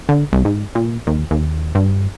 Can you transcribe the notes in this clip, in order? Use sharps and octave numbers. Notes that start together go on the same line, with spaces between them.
D3
C2
G#2
A#2
D#2
D#2
G2